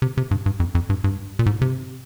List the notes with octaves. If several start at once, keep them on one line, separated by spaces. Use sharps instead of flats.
C3
C3
G2
G2
F2
F2
G2
G2
A#2
G#2
C3